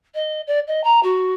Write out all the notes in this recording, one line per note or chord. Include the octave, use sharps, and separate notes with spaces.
D#5
D5
D#5
A#5
F#4